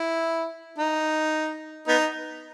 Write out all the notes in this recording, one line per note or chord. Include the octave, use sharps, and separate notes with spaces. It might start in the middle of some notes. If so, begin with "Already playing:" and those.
Already playing: E4
D#4
B3 D#4